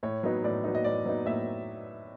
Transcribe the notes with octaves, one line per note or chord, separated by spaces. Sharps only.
A2 C#5
F#3 B3 D#4
A2 D5
F#3 B3 D#4
D#5
A2 D5
F#3 B3 D#4
A2 E5